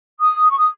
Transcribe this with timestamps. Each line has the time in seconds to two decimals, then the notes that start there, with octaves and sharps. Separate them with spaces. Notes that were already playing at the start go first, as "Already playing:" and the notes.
0.20 D#6
0.50 C#6
0.58 D#6